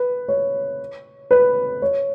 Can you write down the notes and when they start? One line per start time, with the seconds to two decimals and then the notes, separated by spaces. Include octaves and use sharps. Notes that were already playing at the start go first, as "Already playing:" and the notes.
Already playing: B4
0.28 C#5
1.31 B4
1.82 C#5